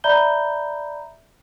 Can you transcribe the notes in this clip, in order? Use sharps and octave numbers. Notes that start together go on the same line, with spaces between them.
D5 E5 A#5 B5 G6 G7